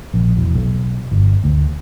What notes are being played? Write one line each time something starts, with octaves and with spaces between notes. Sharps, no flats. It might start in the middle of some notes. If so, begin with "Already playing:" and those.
A#1
E1
B1
G1
D2